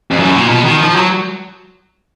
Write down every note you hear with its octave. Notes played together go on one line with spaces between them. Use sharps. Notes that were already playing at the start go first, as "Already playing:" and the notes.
F2
F#2
A#2
B2
D#3
F3
F#3